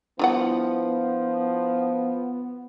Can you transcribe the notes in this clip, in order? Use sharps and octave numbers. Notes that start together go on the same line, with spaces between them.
F3 G3 B3 D4 E4 F4 F#5